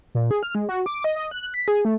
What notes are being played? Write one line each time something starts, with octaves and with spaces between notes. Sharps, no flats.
A#2
G#4
F6
G#3
F#4
D6
D#5
D#5
F#6
B6
G#4
A3